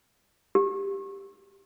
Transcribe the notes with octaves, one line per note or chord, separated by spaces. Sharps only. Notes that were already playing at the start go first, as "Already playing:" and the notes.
G4